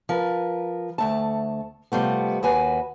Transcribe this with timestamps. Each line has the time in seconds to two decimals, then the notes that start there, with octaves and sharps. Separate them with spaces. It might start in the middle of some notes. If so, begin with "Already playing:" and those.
0.09 F3 A#4 B4
0.98 D2 A3 A5
1.92 C3 F3 G3 A3 B3
2.43 D#2 F#4 B4 G#5